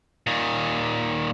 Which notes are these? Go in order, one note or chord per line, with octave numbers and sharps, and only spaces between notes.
A#2 D#3